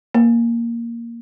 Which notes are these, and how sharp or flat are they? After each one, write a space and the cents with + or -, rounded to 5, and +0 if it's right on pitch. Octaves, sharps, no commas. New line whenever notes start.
A#3 +0